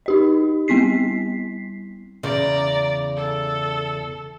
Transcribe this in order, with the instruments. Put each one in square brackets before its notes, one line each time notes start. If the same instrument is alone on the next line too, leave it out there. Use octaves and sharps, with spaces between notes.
[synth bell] D#4 G4 D#5
G3 B3 C4 E4 B6 C7
[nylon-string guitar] E2 C#3 [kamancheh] D5 A#5
[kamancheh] A4